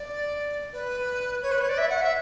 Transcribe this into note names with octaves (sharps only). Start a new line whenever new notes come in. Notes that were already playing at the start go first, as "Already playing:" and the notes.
Already playing: D5
B4
C#5
B4
C#5
D5
E5
F#5
E5